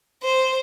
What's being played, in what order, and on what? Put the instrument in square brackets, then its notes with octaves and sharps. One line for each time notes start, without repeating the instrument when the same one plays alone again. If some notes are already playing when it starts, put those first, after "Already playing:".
[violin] C5